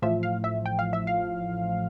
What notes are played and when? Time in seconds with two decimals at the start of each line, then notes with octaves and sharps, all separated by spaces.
0.02 A1 A2 F3 E5
0.23 F5
0.44 E5
0.66 G5
0.79 F5
0.93 E5
1.07 F5